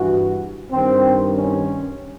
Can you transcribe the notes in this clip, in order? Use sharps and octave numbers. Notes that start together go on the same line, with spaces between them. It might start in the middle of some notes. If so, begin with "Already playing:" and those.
Already playing: G2 E3 F#4
G2 D#3 C4
C#4